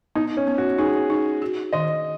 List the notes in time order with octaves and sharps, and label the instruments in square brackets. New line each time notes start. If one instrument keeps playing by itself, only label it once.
[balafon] B3 [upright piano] D#4
[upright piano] C#4
[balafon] B3
[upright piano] F#4
[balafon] D#4 [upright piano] G#4
[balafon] D#4
F#4
[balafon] D#3 [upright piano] D#5